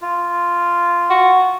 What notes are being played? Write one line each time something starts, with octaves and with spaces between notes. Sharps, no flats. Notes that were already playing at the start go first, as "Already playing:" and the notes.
F4
F#4